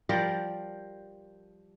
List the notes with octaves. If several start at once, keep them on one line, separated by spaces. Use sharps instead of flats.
F3 G3 A#4 D5